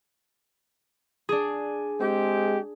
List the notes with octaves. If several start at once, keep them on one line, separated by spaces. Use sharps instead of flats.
D4 G#4
G#3 C4 G4